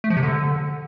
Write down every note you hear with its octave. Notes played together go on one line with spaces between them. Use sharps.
A3
F3
C3
D3